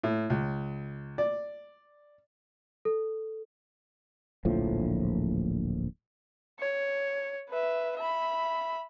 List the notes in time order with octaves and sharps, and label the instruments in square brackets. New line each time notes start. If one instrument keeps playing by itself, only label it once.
[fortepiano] A2
C#2
D5
[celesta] A4
[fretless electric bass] D1 A#1 A2 F3
[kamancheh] C#5
B4 E5
E5 B5